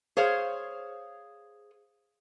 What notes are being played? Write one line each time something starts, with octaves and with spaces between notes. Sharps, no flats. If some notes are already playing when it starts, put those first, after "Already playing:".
G#4 C5 C#5 F5